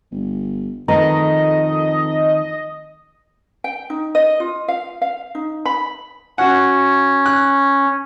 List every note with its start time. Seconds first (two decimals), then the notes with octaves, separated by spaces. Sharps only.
0.11 G1
0.88 F2 D#3 A3 B4 D#5 A#5
3.64 G5
3.90 D#4
4.15 D#5
4.40 F4
4.68 F5
5.01 F5
5.35 D#4
5.65 B5
6.38 C#4 F#4 F#5
7.26 F#6